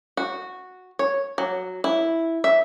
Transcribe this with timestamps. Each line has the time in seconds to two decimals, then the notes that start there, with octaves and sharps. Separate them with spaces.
0.17 F#4
0.99 C#5
1.38 F#3
1.84 E4
2.44 E5